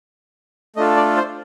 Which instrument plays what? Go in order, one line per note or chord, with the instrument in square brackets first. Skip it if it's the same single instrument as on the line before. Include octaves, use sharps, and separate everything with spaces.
[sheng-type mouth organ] A3 D4 F4 A4 D#5
D5
C5